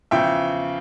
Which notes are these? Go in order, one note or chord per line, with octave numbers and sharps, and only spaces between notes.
E2 C#3 F3 E5 G5